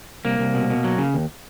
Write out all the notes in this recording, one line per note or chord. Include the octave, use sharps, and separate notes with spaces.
C2 A#3
C2
B2
B2
F#3
C#3
D#2